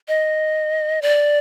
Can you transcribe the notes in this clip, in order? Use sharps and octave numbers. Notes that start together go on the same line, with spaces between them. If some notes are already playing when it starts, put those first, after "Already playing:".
D#5
D5